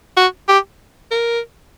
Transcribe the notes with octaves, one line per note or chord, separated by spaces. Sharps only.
F#4
G4
A#4